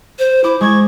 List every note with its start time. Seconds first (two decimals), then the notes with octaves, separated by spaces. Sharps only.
0.19 C5
0.44 E4 D6
0.61 G#3 C#6 G#6